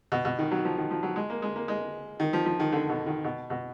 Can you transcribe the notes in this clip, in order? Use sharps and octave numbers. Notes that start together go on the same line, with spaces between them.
B2
B2
D#3
F#3
F3
D#3
F3
F#3
G#3
A#3
G#3
A#3
G#3
D#3
F3
F3
D#3
D3
B2
D#3
B2
B2